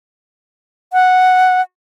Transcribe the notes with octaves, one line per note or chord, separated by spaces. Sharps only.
F#5